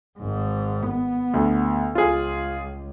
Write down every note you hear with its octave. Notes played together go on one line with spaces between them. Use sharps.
G#1 G#2
B3
D2
C#2 F4 G#4